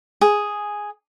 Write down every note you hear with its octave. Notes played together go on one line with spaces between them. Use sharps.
G#4